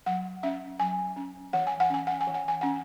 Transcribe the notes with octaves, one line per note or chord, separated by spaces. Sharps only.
F#3 F#5
C#4 E5
F#3 G#5
C#4
E3 F#5
G#5
F#5
C#4 G#5
F#5
G#5
E3
F#5
G#5
C#4 F#5